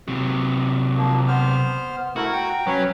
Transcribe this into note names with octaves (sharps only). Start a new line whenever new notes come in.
C3 F#3
F3 A#3
B3 C5 F6
A3 E4 F#4 A#4
G5 A#5
F#3 C#4 B4 C#5